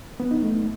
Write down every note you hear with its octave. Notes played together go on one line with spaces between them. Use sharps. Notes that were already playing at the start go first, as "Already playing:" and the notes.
B3
D#4
A3